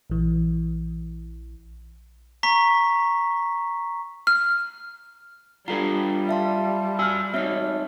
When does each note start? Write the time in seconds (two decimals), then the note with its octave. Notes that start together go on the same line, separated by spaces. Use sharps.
0.10 A#1 E3
2.43 A#5 C#6 B6
4.27 F6
5.68 G3 D4 F4 G4 A4 B4 A#5
6.29 E5 F5 A5 C6
6.99 F#4 G#5 E6 F6
7.34 C4 D#4 F#4 C#5 E5 F6